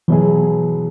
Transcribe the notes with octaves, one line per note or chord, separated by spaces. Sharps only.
B2 E3 F#3 B3 E4 G#4